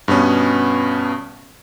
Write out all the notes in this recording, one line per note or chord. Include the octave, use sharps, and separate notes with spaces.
G2 B2 B3 C#4